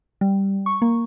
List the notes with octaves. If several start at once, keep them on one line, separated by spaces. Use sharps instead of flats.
G3
C#6
A#3